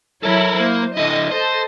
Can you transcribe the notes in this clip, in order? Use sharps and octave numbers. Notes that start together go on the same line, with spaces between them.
F#3 E4 A4 A#4 C#5
A#3 C5
D3 E4 D#5
A4 C5 D#5